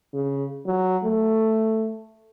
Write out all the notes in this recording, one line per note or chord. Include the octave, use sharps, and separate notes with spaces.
C#3
F#3
A3